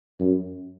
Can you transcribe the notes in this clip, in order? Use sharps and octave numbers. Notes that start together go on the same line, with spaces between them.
F#2